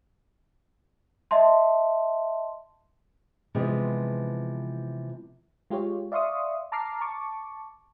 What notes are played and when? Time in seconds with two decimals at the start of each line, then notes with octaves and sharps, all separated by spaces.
1.31 D#5 E5 A5 C6
3.55 C3 E3 F3 G#3 B3
5.70 G#3 F4 G4 G#4 C#5
6.12 D5 E5 F5 C6 C#6 D#6
6.72 A5 A#5 D6 F6 C7
7.01 A5 C#6 D6